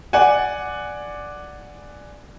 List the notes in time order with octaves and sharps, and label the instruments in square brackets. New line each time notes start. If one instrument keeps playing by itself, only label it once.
[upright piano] D5 F#5 G#5